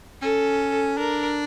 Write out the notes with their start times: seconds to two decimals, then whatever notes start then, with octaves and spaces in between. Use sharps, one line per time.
0.22 C#4 A4
0.97 D4 A#4